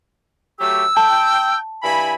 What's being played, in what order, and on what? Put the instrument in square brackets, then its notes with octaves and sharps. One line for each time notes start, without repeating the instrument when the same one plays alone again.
[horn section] F#3 A3 G4 [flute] E6
[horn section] G5 [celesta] A5
[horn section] G2 E4 B5 [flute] G#5